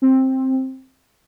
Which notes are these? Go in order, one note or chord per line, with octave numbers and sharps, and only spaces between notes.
C4